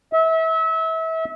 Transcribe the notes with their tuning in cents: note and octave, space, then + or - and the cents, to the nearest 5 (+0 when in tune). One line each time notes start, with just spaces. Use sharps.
E5 -30